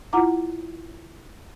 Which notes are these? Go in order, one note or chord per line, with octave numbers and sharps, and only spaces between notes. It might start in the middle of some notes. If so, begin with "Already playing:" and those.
E4 F4 F#5 A#5 D6